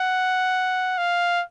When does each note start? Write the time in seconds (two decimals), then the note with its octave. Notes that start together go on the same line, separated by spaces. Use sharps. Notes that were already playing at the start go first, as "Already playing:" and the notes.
Already playing: F#5
0.98 F5